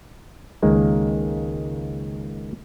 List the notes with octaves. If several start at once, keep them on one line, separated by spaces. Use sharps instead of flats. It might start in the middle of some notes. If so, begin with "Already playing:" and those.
C#2 D#3 G#3 A#3